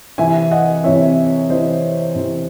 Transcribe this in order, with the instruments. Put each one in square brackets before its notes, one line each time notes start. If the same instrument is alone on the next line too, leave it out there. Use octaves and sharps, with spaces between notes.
[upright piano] C3 E3 C4 E5 G#5
D#5 F#5
C3 E3 C4 C#5 E5
C3 E3 C4 C5 D#5
C3 E3 C4